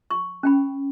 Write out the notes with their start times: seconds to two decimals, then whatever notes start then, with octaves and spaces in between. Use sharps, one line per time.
0.11 C#6
0.43 C#4 G5 B5